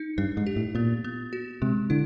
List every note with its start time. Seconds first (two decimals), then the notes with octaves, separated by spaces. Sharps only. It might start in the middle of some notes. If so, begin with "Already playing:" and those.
Already playing: D#4
0.18 G2 D4
0.37 G#2
0.46 G4
0.56 A2
0.75 A#2 B3
1.04 B3
1.33 F#4
1.62 C3 G#3
1.90 D3 E4